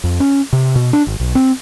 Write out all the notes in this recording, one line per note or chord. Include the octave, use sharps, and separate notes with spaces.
F2
C#4
C3
B2
D4
G#1
B1
C4